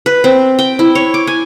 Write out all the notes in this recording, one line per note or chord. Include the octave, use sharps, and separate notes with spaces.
B4
C4
G5
E4
C#5
D6
G#5